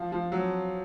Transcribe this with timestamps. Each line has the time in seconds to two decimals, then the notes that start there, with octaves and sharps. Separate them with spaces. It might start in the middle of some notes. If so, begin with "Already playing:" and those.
Already playing: F3
0.12 F3
0.32 F#3